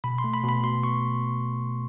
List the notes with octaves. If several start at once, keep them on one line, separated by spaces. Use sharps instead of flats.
B2 B5
C6
A3
B5
B2 B5
B2 C6
B2 C#6